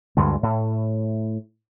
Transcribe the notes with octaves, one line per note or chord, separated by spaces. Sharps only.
D2 G2 D3 G#3
A2